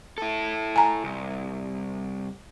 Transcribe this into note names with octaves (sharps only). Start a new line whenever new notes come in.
E4 A4
G#5 A#5
C2